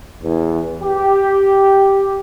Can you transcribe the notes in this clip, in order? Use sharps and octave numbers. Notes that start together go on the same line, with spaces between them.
E2
G4